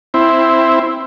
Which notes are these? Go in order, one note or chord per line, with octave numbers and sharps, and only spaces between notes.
C4 E4